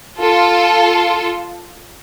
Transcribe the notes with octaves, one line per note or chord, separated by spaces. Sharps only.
F4 A4